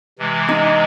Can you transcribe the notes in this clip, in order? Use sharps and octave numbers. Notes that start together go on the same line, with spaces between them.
C3 E3 G#3
D#4